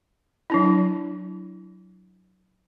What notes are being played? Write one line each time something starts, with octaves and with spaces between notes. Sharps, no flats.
F#3 D4 E4